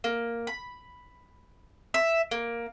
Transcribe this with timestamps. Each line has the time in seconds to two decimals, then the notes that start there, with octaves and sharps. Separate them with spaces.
0.04 A#3
0.47 B5
1.94 E5
2.31 A#3